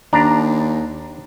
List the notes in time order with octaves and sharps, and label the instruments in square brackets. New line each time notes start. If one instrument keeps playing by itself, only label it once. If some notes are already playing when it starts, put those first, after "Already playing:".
[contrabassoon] D#2 [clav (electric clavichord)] D4 A#5